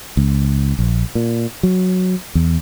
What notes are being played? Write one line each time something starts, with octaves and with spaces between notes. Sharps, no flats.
C#2
A#1
A#2
F#3
E2